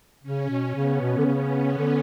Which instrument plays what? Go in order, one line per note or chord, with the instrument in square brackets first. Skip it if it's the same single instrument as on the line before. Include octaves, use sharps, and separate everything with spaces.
[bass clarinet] C#3 [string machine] C#4
[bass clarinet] B2
[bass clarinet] C#3 [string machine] B3
[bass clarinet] B2
D3
C#3
D3